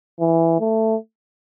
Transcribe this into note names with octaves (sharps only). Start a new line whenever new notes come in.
E3
A3